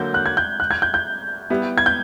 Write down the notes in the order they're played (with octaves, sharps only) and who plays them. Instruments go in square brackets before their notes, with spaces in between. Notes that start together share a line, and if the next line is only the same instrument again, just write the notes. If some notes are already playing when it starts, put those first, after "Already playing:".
Already playing: [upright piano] D3 F#3 A#3 [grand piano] G6
[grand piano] F#6
G#6
G6
F#6
G#6
G6
G6
[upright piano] G3 B3 E4
[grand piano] G#6
G6